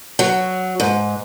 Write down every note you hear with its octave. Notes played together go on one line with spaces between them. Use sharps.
F#3
G#2